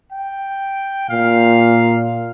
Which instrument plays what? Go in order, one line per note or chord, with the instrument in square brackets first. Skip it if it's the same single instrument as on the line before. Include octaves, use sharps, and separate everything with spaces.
[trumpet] G5
[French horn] A#2 [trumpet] F5